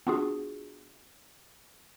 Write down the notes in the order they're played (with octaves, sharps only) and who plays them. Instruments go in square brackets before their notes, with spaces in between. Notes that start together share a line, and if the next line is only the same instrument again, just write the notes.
[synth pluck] B3 D4 F4 F#4 G#4